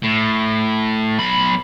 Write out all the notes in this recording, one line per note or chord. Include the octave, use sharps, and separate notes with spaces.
A2
B1 B5